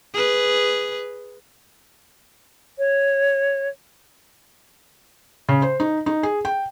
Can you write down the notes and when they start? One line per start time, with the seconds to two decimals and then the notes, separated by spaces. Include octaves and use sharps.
0.14 G#4 B4
2.78 C#5
5.49 C#3
5.62 C5
5.80 D#4
6.06 D#4
6.23 G#4
6.45 G5